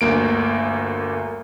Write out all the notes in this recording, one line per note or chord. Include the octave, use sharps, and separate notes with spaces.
G1 D2 A#3 D7